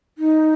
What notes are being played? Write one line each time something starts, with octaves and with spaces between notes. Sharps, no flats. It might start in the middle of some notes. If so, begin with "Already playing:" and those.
D#4